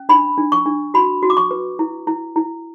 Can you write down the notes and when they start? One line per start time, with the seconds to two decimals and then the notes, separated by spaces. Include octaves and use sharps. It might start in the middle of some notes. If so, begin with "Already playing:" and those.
Already playing: C#4
0.09 D4 B5
0.38 D4
0.52 C#6
0.66 D4
0.94 F#4 B5
1.23 F#4
1.30 D6
1.37 C#6
1.51 B4
1.79 E4
2.07 E4
2.36 E4